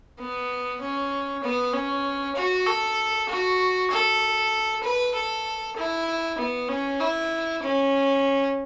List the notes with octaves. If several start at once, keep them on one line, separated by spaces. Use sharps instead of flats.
B3
C#4
B3
C#4
F#4
A4
F#4
A4
B4
A4
E4
B3
C#4
E4
C#4